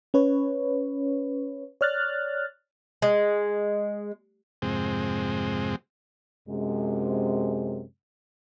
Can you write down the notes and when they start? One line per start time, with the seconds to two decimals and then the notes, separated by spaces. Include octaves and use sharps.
0.14 C#4 B4 C#5
1.81 C#5 D5 F6 F#6 A6
3.02 G#3
4.62 F2 G#2 C3 G#3 C4
6.49 F#2 C3 G#3